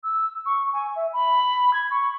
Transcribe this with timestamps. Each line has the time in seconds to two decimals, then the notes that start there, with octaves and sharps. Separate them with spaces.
0.03 E6
0.46 C#6
0.73 G#5
0.96 E5
1.13 B5
1.73 G#6
1.91 C#6